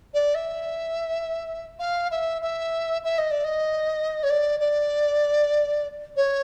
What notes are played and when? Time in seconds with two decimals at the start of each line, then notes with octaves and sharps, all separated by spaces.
0.14 D5
0.34 E5
1.79 F5
2.11 E5
2.41 E5
3.04 E5
3.18 D#5
3.31 D5
3.44 D#5
4.23 C#5
4.29 D5
4.59 D5
6.16 C#5